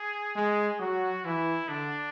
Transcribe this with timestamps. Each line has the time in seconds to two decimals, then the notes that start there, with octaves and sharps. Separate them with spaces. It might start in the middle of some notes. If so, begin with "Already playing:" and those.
Already playing: G#4
0.36 G#3
0.80 F#3 F#4
1.25 E3 E4
1.69 D3 D4